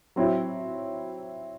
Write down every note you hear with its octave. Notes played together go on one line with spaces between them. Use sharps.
F#3 C4 E4